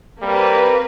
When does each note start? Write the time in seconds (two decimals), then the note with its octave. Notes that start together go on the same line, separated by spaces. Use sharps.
0.22 G3 A#3 C4 B4